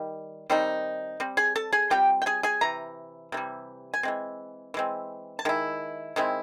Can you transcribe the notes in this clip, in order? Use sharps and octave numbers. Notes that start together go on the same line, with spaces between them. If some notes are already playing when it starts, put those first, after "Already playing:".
Already playing: D#3 G3
D#3 G3 C4 D#4
G3 C4
G#4 G#5
A4 A5
G#4 G#5
G3 C4 F4 G4 G5
G5
G#4 G#5
G#4 G#5
C3 E3 A#5
C3 E3 G3
G#5
E3 G#3 C4
E3 G#3 C4
A5
D#3 G#3 E4
D#3 G#3 C4 E4